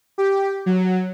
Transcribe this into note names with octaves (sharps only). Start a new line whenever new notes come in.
G4
F#3